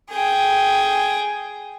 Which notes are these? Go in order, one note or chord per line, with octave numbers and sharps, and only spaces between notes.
G#4 G5